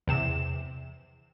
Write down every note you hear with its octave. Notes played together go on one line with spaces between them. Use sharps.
E2 C3 E7